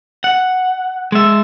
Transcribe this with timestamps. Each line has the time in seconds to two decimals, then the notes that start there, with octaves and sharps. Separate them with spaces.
0.24 F#5
1.12 G#3 E5